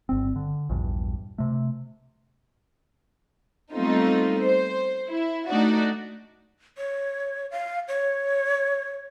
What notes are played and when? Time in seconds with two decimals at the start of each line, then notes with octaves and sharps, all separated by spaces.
0.09 G1 C4
0.36 D3
0.69 A#1 E2 G2
1.38 C3 A3
3.73 G3 A3 B3 C4 D#4 F4
4.39 C5
5.10 E4
5.49 A3 D4 D#4 F#4 D5
6.78 C#5
7.51 F5
7.88 C#5